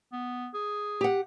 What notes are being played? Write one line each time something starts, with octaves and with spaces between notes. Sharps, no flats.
B3
G#4
G4 F#5